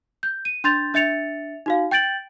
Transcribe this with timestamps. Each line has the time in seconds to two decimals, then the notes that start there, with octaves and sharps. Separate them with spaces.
0.23 G6
0.45 D#7
0.64 D4 C6 G6 A6 F7
0.94 D4 E5 A6 C#7 F7
1.66 D#4 F#4 F5
1.91 G5 G6 A6 D7 F#7